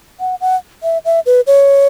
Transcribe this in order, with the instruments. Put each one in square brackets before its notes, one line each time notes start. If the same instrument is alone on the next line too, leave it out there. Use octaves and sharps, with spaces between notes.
[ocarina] F#5
F#5
E5
E5
B4
C#5